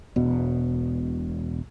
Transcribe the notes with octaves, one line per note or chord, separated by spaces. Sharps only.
E1 B2